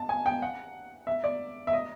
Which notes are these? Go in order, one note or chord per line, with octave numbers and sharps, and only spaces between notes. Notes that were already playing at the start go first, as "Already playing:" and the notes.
Already playing: A5
G#5
G5
F#5
E5
D5
E5
D#5